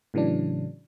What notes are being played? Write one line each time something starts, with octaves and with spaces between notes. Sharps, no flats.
A2 C#3 E3 F#3 D4